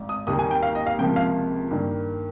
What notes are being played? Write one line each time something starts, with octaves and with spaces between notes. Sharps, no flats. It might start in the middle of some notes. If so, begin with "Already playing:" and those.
Already playing: G#1 G#2
D#6
D#2 D#3 G3 A#3 D#6
G#5
G5
F5
D#5
F5
C#2 C3 F3 A#3 G5
F5
G2 D#3 A#3